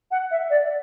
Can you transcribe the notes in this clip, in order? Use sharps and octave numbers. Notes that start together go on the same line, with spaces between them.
F#5
E5
D5